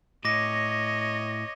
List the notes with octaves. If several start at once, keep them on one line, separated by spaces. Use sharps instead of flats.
A2 C#5 D#5 D6 A#6